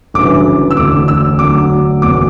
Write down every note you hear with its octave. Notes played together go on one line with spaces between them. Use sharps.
G1 F#2 C#3 E3 D6
E6
E1 D2 D3 D6
E6
D2 D3 F#3 D6
F#1 E2 B2 D6